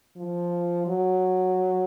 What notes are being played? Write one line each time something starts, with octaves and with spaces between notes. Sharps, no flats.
F3
F#3